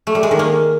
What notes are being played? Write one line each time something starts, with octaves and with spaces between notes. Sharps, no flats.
A3
G3
G#3
D#3
A#3